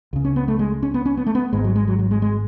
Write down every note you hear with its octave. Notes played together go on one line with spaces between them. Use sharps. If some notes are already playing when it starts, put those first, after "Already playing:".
C#2 C#3
C#4
B3
A3
G#3
C#4
B3
C#4
B3
A3
B3
G#1 G#2 G#3
F#3
G#3
F#3
F#3
G#3
G#3